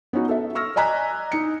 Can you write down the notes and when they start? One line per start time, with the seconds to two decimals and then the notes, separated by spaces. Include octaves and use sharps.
0.13 B3 C#4 D#4 F#4
0.29 A4 E5
0.55 C#6 E6 F6 A#6
0.76 D5 D#5 G#5 A#5 F#6 B6
1.32 D#4 C#7